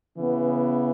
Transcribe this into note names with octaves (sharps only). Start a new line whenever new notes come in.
C#3 E3 B3